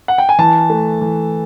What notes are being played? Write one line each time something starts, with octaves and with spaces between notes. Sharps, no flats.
F#5
G5
G#5
E3 A5
A3
E3